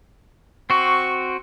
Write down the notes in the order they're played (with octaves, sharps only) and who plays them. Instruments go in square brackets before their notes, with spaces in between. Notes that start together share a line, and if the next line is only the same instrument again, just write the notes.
[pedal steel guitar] C4 F#4 [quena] C#6